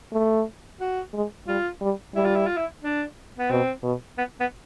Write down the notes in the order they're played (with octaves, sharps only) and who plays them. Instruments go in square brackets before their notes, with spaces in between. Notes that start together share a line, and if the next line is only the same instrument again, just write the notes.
[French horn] A3
[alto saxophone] F#4
[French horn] G#3
[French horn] G3 [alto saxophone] F4
[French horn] G3
[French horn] G3 [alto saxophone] E4
[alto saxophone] F4
E4
F4
E4
D4
B3
[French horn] B2 [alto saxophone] C4
[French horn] B2
[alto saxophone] B3
B3